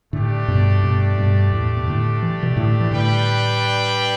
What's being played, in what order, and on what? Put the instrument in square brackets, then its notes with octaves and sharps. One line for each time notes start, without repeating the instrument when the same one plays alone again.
[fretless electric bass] A2 D3 [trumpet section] A3 D4 G4 D5
[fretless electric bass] G2 B2
G2 B2
G2 B2
E2 A2
B2
A2 D3
E3
B2 E3
A2 D3
E3
[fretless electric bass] A2 D3 [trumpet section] G3 D4 B4 G5